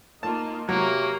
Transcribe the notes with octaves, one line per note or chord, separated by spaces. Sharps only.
A#3 D#4 F4 A5
C3 F#3 A#3 A#4 C#5 A#5